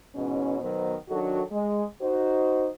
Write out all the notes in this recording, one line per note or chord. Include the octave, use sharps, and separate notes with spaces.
G#2 B2 E3 C#4
B2 D#3 F#3 B3 C5
D#3 F#3 D4 F#4 A4
G#3
D#4 F#4 C5